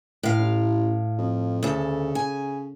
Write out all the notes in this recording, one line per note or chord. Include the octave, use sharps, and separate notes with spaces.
A2 F5
A1
F2
D2 C#3 A4
G#5